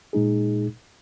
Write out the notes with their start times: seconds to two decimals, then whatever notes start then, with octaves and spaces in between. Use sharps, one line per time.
0.13 A#2 G#3 D#4 G#4